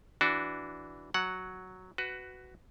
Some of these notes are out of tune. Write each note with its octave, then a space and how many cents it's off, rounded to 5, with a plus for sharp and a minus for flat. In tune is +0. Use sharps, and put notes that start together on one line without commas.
E3 +0 D4 +0 F#4 +0
F#3 +0 F#5 +0
F#4 +5 B4 +15